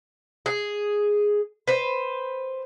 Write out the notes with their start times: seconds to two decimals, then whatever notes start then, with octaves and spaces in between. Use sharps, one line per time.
0.46 G#4
1.67 B4 C5